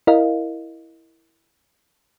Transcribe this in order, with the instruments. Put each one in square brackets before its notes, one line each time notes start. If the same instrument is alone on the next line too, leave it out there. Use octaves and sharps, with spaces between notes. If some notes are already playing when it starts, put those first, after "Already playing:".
[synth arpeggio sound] E4 A#4 D#5 F5